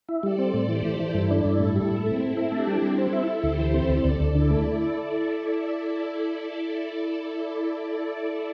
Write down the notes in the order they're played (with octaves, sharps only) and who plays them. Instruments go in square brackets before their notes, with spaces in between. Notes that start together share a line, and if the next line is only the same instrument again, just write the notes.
[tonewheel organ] E4
[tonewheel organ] G3 [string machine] A4 D5
[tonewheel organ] C4
A2
[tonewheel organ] E3 [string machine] G4 C5
[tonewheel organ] E3
E3
[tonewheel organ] G2 [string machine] E4 A4
[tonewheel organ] D4
G2
A2
G3
A2
[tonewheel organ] A3 [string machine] C4 E4
[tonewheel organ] A3
E4
[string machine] D4 G4 [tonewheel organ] A4
[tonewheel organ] G3
G3
[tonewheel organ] C4 [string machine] E4 A4
[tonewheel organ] E4
E4
[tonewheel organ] D2 [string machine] G4 C5
[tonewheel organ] E3
C4
[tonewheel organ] D2 [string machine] A4 D5
[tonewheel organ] D2
D2
[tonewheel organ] D3 [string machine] E4 A4
[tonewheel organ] A3